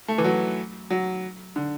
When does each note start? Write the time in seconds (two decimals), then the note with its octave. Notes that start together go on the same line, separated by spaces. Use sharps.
0.08 A3
0.18 E3
0.24 F#3
0.90 F#3
1.56 D3